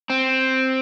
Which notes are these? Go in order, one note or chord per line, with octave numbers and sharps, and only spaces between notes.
C4